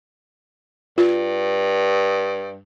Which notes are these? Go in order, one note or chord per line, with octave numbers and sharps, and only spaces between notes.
G2 F4